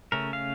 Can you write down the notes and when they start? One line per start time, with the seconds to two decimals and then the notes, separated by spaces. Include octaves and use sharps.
0.12 C#3 A3 C#4 A#4
0.33 F5